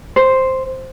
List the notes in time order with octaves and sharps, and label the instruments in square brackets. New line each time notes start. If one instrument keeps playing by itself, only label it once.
[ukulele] C5